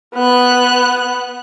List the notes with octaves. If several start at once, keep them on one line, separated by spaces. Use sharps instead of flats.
B3 F#6